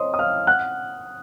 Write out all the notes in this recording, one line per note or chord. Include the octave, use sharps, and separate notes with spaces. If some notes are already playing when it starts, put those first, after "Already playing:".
Already playing: C5 C#5 D#5 C6 D#6
D#6
F5 F6
F#5 F#6